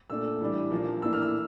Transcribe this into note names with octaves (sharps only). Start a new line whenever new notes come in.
A#2 A3 D4 E6
A2 E3 G3 D4
A#2 F3 A#3 D4
A2 E3 A#3 D4 E6
F6
E6